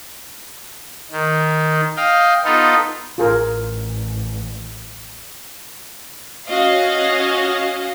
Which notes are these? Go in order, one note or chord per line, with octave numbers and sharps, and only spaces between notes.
D#3
D#5 F5 G5
B3 D#4 F4 A4
A1 F4 G#4 A#4
C#4 F#4 D#5 F5